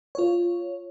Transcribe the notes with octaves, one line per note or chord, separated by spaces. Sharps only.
F4 C#5